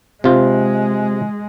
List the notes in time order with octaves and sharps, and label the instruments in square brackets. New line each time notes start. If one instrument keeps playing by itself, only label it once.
[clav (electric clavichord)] C3 F4 [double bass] G#3